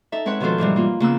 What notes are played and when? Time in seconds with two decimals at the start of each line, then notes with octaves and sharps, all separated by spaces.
0.12 D#4 A4 E5
0.26 G#3 C4 B4 C#5 F#5
0.40 B2 D#3 F3 F#4 A4 C5
0.58 G#2 B2 E3 G3
0.76 A#3 F4
1.00 C#3 A#3 B3 E6